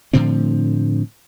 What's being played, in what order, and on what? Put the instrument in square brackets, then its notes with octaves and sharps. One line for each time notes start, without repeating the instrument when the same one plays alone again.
[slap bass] A2 D3 F3 C4